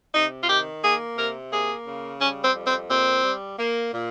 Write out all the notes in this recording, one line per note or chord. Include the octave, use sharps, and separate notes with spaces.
C3 D#4
F4
D#3 G4
A#3 G#4
C3 A#4
A#3 G#4
C#3
G3 C#4
C4
F2
C4
A#2 C4
G3
A#3
A#2